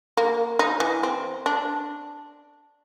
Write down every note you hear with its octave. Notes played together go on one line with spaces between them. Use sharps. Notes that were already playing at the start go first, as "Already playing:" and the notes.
A#3
D#4
E3
C4
D4